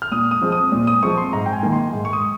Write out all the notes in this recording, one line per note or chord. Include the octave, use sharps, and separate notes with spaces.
F6
A#2 D#6
D#6
F3 G#3 C4
D#6
A#2
D#6
F3 G#3 C4 C#6
C6
G#2 A#5
G5
G#5
D#3 A#3
C6
G#2
C#6
D#6